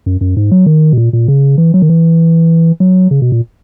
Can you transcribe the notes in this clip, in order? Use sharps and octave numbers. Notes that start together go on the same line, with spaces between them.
F#2
F#2
G#2
F#3
D#3
B2
A#2
A#2
C#3
E3
F#3
D#3
E3
F#3
C#3
B2
A#2